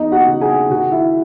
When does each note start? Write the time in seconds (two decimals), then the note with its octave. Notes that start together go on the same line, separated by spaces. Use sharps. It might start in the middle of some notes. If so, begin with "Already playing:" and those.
Already playing: E2 D#4 D#5
0.12 F#4 F#5
0.26 C#3
0.41 G#4 G#5
0.70 D#3 F#4 F#5
0.92 E4 E5